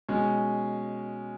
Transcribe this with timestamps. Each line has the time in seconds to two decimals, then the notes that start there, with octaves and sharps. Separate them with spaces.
0.08 B2 G#3 C#4